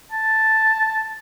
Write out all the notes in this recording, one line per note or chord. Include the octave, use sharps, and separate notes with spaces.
A5